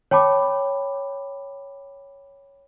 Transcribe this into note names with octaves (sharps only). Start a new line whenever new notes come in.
C#5 G5 A5 B5 D6